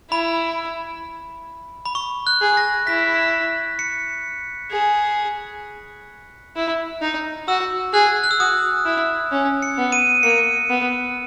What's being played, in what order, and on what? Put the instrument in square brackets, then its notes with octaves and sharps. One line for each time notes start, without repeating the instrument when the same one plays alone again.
[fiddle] E4 [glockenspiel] B5
[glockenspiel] B5
C#6
F#6
[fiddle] G#4
[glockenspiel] A#6
[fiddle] E4 [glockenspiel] B6
[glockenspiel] C#7
[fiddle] G#4
E4
D#4
[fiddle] F#4 [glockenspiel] E6
[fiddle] G#4 [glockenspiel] F#6
[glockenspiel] F#6
E6
[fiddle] F#4 [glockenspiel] D#6
[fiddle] E4
C#4
[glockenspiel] C#7
[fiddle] B3
[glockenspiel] D#7
[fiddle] A#3 [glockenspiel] C#7
[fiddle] B3